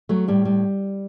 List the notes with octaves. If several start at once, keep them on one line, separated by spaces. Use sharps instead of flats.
F#3 A3
A2 G3
G3